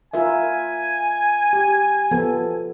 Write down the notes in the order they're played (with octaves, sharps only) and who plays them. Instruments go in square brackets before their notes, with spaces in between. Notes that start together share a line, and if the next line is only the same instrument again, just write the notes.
[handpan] F4 A#4 E5 [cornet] G#5
[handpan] G4
F3 B3 A4